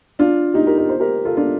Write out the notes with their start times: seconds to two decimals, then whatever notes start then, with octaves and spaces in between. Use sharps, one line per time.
0.19 D4 F4
0.54 D#4 G4
0.67 G4 A#4
0.78 A#4
0.89 C5
1.00 G4 A#4
1.25 F4 A4
1.37 D4 F4